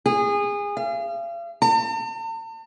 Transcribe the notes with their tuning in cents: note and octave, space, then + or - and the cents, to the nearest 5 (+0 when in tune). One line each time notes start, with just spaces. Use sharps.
G#4 -25
F5 -40
A5 +45